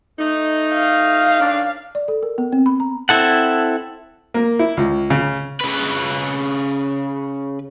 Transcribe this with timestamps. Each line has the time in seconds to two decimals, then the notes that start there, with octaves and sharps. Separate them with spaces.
0.19 A3 D#4
0.74 F5
1.40 D#3 C#4 D4
1.95 D5
2.08 A4
2.23 A#4
2.38 B3
2.53 C4
2.66 B5
2.80 A#5
3.09 C4 E4 A4 F#5
4.34 A#3
4.59 E4
4.77 C#2
5.10 C#3
5.61 C#3 B4